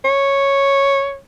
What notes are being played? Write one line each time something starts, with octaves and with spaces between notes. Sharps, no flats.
C#5